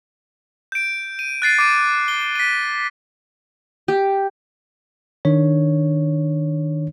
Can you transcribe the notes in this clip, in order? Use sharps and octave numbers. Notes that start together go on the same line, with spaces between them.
G6 D7
D#7
F#6 A6 C7 D#7
D6 D7 D#7
G7
B6 D#7
G4
D#3 D4 C#5